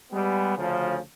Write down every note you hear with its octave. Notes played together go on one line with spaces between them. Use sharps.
G3 G#3 B3
D2 C#3 F3